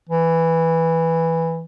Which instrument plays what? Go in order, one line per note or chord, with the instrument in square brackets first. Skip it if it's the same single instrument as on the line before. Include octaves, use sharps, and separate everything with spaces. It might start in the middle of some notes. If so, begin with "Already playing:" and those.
[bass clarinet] E3